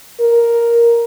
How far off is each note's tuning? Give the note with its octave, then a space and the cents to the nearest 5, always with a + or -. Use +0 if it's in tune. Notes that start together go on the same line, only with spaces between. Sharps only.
A#4 +5